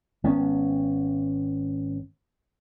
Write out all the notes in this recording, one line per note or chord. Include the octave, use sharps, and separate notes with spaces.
G#1 B3 C#4